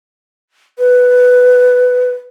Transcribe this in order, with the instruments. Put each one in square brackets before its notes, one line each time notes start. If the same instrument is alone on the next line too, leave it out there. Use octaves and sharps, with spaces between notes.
[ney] B4